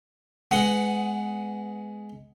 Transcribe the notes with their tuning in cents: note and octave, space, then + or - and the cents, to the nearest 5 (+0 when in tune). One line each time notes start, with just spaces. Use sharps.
G#3 +10 B3 +25 F#5 +0